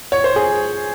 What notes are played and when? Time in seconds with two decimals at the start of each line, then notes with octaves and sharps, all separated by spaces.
0.12 C#5
0.24 C5
0.36 G#4